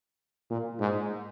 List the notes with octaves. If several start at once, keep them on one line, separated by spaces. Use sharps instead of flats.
A#2
G#2